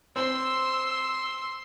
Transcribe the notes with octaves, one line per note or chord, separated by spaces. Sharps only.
C4 C6 E6